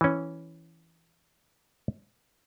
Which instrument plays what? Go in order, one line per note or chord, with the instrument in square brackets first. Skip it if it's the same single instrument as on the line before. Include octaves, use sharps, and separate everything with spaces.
[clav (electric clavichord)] E3 C#4